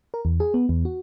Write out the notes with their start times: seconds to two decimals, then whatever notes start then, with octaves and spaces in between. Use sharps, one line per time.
0.14 A#4
0.25 E2
0.40 G#4
0.54 B3
0.69 E2
0.85 F#4